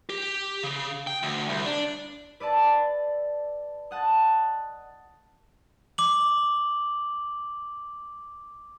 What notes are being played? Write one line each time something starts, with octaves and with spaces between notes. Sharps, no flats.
G4
C#3
G5
D2
C2
D4
B4 D5 E5 A5
D#5 F#5 A5
D6 F#7